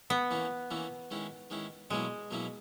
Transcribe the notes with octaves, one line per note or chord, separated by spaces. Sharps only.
B3
E3 A#3 C#4 E4
E3 A#3 C#4 E4
D#3 G#3 C#4 E4
D#3 G#3 C#4 E4
B2 F#3 G#3 A#3 C#4 E4
B2 F#3 A#3 C#4 E4